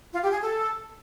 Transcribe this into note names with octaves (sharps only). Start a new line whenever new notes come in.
F4
G4
G#4
A4